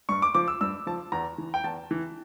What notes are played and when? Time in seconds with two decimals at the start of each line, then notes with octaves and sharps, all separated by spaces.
0.09 G2 C#6
0.22 D6
0.35 F3 D6
0.48 E6
0.61 G2 E6
0.87 F3 A5
1.12 E2 A#5
1.38 E3
1.54 G5
1.64 E2 A5
1.91 E3